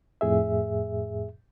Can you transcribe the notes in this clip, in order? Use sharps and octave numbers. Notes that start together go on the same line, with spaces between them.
F2 A2 G#4 E5